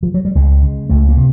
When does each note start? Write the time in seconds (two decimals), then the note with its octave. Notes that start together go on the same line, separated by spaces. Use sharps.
0.03 F3
0.14 F#3
0.25 G3
0.35 C#2 G#3
0.62 C#3
0.89 C#2 A3
1.09 A#3
1.17 C3